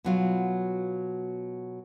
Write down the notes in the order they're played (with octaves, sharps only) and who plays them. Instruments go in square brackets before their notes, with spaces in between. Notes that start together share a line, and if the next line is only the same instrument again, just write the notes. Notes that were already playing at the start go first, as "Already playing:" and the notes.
[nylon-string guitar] B2 F#3 F4